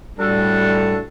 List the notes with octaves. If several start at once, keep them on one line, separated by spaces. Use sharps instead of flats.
A2 G3 D4 F#4 A4